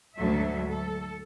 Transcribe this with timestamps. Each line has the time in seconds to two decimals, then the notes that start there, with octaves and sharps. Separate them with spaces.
0.18 D2 G#2 F#3 A4 E5
0.68 A4